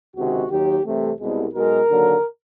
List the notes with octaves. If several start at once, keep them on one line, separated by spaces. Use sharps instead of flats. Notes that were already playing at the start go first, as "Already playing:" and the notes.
C#2 C3 D#3 G#3 F#4
D#2 D#3 F#3 G4
C2 C3 E3 A3
C2 B2 G#3
B1 B2 G#3 A#4
D#2 D3 F#3 A#3